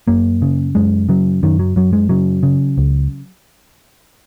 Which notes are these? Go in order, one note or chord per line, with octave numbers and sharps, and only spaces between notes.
F#2 A#3
C#3
F#2 G#3
C#3 F#3
F#2 D#3
F#3
F#2 F#3
G#3
C#3 F#3
C#3
C#2